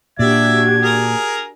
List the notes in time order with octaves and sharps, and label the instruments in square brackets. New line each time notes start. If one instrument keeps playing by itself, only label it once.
[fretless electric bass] A#2 [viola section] D4 F#4 G4 [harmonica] D5 E5 [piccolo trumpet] G#6
[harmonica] G#4 A#4